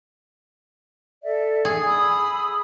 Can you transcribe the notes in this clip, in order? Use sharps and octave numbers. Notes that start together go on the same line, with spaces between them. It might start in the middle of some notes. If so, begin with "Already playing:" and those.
A4 D5 E5
G#4
B5 D#6 E6